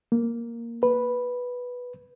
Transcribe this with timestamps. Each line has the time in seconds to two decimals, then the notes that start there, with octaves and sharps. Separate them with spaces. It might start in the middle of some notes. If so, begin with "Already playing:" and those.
0.12 A#3
0.83 B4